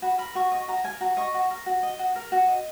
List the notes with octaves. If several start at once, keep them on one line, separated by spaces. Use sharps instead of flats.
F#4 B5
A#4 B5
F#4 C#6
D#5 C#6
F#4 A#5
A#4 G#5
F#4 A#5
D#5 C#6
F#4
A#4
F#4
D#5
F#4
A#4
F#4
D#5